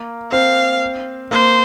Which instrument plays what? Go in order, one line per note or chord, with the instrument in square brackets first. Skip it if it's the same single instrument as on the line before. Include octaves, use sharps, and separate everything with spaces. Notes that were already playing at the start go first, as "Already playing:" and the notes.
Already playing: [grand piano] A#3
[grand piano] C4 [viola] F5
[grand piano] A#3 [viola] C5